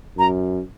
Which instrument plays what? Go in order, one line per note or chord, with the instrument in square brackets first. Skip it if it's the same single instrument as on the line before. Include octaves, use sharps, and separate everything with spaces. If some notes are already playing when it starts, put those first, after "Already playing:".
[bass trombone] F#2 [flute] A#5